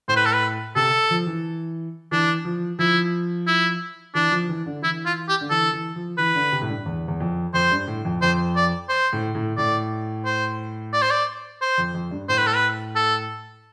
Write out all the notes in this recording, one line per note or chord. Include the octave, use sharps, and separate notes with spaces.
A2 C5
B4
A4
B4
C3 A4
F3
E3
E3 D4
F3
F3 E4
E4
E3 D4
F3
E3
D3
E3 E4
F4
G4
D3
E3 A4
E3
F3
E3 B4
D3
C3
A2
G2
E2
E2
F2
F2 C5
G2
A2
F2
F2 C5
D5
C5
A2
A2
A2 D5
C5
D5
C5
D5
C5
F2
F2
G2
A2 C5
B4
A4
B4
A4